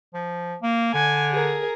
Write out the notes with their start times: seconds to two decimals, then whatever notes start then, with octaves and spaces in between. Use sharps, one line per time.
0.14 F3
0.62 A#3
0.94 D3 G#5
1.31 G#4 A#4